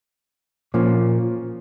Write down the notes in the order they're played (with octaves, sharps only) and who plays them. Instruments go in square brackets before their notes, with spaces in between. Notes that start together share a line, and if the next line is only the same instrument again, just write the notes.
[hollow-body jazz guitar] A#2 F3 A#3 C#4